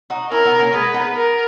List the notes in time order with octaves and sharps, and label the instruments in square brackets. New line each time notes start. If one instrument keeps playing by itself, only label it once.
[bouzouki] D#4 F#4
[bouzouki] C#4 E4 [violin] A#4
[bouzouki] B3 D#4
A#3 C#4
[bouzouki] G#3 B3 [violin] B4
[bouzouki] B3 D#4
[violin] A#4